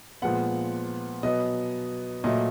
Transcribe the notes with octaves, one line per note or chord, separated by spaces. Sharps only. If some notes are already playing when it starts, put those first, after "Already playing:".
A#2 F3 G#3 B3 F#5
B2 F#3 B3 D#5
A#2 F#3 A3 D#5